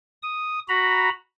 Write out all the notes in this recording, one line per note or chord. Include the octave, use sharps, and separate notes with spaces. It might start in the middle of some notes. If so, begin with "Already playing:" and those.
D#6
F#4 A#5 B5